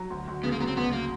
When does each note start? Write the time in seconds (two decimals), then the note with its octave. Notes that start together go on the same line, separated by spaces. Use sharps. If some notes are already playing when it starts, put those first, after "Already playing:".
Already playing: F#3
0.10 D2
0.27 D2
0.44 C#3 B3
0.52 A#3
0.60 F#3 B3
0.67 C4
0.77 D2 B3
0.92 A#3